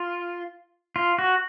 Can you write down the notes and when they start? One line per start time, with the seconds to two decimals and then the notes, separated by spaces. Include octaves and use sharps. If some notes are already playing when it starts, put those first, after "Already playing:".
Already playing: F4
0.96 F4
1.19 F#4